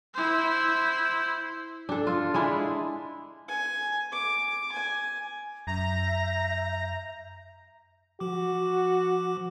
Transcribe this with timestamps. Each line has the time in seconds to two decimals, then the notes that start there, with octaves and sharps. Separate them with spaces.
0.14 E4 C5
1.89 D4 A4
2.07 F4
2.34 G#3 D4 E4
3.48 G#5
4.12 D6
4.72 G#5
5.67 F#2 E5 A#5 G6 A#6
8.20 F3 F#4 D6